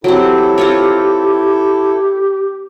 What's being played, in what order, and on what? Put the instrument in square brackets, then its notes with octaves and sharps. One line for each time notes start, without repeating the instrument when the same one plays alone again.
[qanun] F#3 C4 [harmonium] E4 A4 [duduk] G4
[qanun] C4 F4 C#5